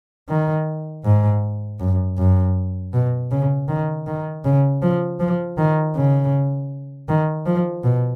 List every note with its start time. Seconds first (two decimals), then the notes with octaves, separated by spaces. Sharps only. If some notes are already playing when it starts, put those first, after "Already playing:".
0.29 D#3
1.05 G#2
1.80 F#2
2.18 F#2
2.93 B2
3.31 C#3
3.68 D#3
4.07 D#3
4.45 C#3
4.82 F3
5.20 F3
5.58 D#3
5.95 C#3
7.08 D#3
7.46 F3
7.84 B2